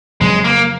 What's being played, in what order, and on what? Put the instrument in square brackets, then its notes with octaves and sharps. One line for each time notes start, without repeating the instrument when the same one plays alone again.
[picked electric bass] F2 C#3 F#3 [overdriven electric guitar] G#3
[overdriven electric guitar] A#3